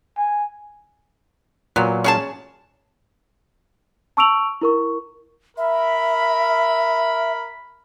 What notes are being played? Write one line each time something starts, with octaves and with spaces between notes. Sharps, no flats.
G#5
A#2 F#3 B3
C#4 G#4 A5
A5 C#6 E6 D7 F7 F#7
E4 A#4 C#6
A#4 E5 B5